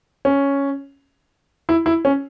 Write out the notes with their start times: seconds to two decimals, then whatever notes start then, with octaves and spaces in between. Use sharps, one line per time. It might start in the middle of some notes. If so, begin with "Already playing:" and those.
0.25 C#4
1.69 E4
1.86 E4
2.05 C#4